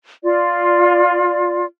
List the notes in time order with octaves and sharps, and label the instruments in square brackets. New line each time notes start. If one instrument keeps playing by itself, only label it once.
[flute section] F4 D5